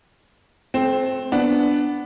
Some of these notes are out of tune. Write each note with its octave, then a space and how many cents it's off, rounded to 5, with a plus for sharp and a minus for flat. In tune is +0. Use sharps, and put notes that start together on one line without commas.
A3 -40 C4 +0
B3 +5 D4 +0